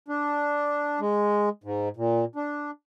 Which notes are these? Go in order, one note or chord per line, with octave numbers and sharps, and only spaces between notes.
D4
G#3
G#2
A#2
D4